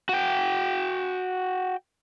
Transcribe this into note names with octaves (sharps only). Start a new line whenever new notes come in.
F#4 G5